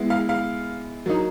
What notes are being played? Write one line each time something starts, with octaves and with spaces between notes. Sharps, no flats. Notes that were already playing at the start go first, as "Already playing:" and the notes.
Already playing: G#3 B3 E4
F5
F5
F#3 A#3 D#4